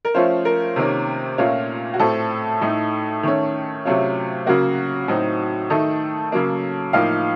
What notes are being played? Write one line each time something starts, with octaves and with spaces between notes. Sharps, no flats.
A#4
F3 A3 C#4 F4 C5
A#4
C3 D#3 A#3 C#4
A#2 A3 C#4 F4
F#4
A2 A3 C4 A4
A2 A3 D#4
D#3 A3 C#4
C3 F#3 A3 C#4 F4
C#3 F#3 A#3 F#4
A2 F#3 C4 D#4
D#3 A3 D#4 A4
C#3 F#3 A#3
A2 F3 A#3 D#4 F5